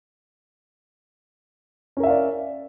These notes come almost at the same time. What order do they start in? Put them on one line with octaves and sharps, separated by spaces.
C#4 A#4 E5 F5 D5